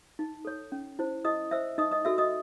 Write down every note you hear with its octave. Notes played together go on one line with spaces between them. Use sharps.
D#4
A4 C#5
C#4
E4 C5
E4 D#5 D#6
C5 E5 E6
D#4 D#5 D#6
D#5 D#6
F#4 A4 E5 E6
D#5 D#6